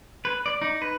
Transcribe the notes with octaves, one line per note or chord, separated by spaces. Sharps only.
B4
D5
D#4
B4